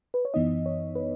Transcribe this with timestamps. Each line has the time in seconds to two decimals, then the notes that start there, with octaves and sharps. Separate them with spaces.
0.14 B4
0.25 C#5
0.34 F#2 E3 B3 D#4 D#5
0.66 C#5
0.96 B4